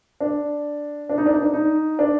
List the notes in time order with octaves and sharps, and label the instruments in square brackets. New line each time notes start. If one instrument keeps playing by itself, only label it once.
[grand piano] D4
D4
D#4
D4
D#4
D4
D#4
D4